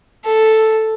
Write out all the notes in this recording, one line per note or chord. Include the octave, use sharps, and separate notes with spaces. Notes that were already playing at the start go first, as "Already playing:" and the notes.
A4